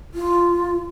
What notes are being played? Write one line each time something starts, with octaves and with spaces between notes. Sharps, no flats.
F4